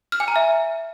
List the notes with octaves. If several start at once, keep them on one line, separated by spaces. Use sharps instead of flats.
F6
G#5
A#5
E5